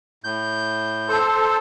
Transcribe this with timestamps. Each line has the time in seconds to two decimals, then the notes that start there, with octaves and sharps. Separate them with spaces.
0.24 A2 G6
1.08 A4 C5